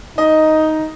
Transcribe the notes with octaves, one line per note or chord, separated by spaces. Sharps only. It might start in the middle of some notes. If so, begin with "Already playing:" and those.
D#4 D#5